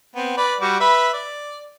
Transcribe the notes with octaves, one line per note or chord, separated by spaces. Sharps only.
B3 C4
B4 D5
G3 F#4 D6
B4 E5
D5